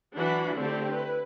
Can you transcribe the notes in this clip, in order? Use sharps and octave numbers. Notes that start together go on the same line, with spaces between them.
E3 F#3 D4 F#4 F#5 B5
D3 A3 C4 E4 G4 A4
E4 B4